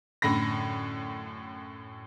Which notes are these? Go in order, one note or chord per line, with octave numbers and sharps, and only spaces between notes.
F#2 A2 D3 B5 A#6